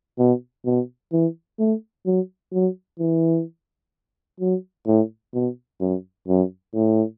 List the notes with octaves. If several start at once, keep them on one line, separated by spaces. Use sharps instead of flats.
B2
B2
E3
A3
F#3
F#3
E3
F#3
A2
B2
F#2
F#2
A2